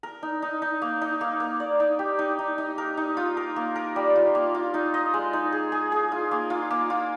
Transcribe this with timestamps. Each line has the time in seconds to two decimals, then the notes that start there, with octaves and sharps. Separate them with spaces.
0.03 A#4
0.23 D#4
0.42 D#4
0.62 D#4
0.82 A#3
1.01 D#4
1.21 A#3
1.40 A#3
1.60 D5
1.80 D#4
1.99 G4
2.19 D#4
2.39 D#4
2.58 D#4
2.78 A#4
2.97 D#4
3.17 F4
3.37 A#4
3.56 A#3
3.76 A#4
3.96 G3
4.16 F4
4.35 A#3
4.55 F4
4.74 D#4
4.94 D#5
5.14 G#3
5.33 D#4
5.52 G#4
5.72 G#4
5.92 G#4
6.12 F4
6.31 A#3
6.50 F4
6.71 A#3
6.90 F4